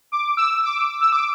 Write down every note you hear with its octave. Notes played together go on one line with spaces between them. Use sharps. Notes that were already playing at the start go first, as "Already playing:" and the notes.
D6
E6
D6
E6
D6